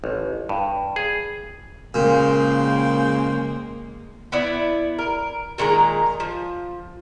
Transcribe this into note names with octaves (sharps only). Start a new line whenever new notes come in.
A1
G2
G#4
A#2 C#3 G#3 A#3 C5 G5
B3 E4 D5
A#4
A#2 D#3 G#3 A#5
F3